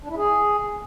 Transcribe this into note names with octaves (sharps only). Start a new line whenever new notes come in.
D4
E4
G#4